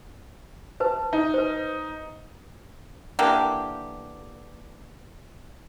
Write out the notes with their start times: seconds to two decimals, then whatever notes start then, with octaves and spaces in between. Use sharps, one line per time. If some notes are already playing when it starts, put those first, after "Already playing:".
0.80 B4 C5 A5
1.13 D#4
1.34 B4 C5
3.19 D3 E3 A#3 G4